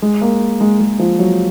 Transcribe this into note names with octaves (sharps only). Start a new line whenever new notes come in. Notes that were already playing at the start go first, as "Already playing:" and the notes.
G#3
A#3
G#3
G#3
F3
F#3